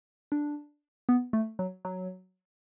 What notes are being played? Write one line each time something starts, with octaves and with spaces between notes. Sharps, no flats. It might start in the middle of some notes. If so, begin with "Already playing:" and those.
D4
B3
A3
F#3
F#3